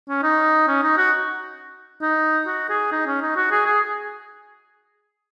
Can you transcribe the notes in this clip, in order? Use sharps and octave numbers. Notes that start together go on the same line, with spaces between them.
C#4
D#4
C#4
D#4
F#4
D#4
F#4
G#4
D#4
C#4
D#4
F#4
G#4
G#4